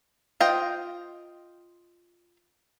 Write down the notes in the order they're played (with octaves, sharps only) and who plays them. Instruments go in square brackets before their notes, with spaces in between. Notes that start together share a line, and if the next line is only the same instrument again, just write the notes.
[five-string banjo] F4 C5 D#5 G5